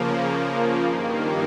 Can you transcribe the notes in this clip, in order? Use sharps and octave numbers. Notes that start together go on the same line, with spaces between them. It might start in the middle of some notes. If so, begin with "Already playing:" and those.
Already playing: C#3 F3 A#3
G2 D#3 A#3